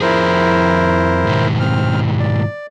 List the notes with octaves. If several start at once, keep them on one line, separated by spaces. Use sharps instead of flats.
F2 F3 E4 G#4 A#4 C5
G#2 B2 D#3
C4 F6
D5